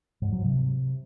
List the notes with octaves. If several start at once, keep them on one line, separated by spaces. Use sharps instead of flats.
G#2
F#3
C3